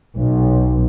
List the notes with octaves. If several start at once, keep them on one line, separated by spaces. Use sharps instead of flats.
B1